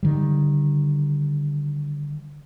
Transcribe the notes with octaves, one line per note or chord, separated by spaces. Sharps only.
D3 D#3 G3